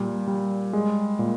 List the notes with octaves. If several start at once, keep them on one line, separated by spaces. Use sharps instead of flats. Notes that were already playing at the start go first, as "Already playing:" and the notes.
Already playing: A#2 G3
G3
G#3
A#2